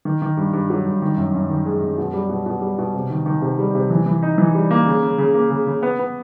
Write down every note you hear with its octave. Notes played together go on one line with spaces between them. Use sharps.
D#3
D#3
G2
G2
F#3
G2
D#3
F#2
F#2
D#3
G#3
F#2
B2
G3
B2
B2
G3
B2
C3
D#3
D#3
C3
G3
C3
E3
E3
D#4
E3
G3
A#3
C#3
C#3
C#3
A#3
C#3
C#3
B3
B3